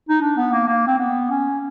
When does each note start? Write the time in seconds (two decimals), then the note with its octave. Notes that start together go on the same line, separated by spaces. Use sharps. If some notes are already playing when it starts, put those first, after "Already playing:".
0.09 D#4
0.21 D4
0.37 B3
0.53 A#3
0.68 A#3
0.87 C4
0.99 B3
1.30 C#4